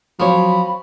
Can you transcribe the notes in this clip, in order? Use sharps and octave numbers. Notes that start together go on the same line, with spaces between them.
F3 F#3 C4 C#5 B5